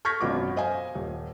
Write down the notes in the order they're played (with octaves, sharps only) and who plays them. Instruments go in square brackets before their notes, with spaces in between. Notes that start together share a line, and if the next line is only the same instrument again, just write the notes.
[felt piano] C#6 F6 G6 G#6 A#6 B6
G#1 F#2 B2 B3 F4 D6
C5 D#5 F5 G#5
D#1